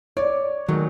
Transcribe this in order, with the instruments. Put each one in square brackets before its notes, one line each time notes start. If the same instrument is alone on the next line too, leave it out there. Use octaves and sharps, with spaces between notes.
[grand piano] C#5 [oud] D5
[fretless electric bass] D#3 [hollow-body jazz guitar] F#3 [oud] G#3 A3